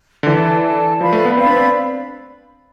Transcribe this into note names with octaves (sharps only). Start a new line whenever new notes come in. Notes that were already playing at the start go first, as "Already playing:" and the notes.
D3
E3 A4 D5 A5
A4 D5 A5
F3 B4 D5 F5 B5
A3
B3
C4 B4 D5 F5 B5
D4
C4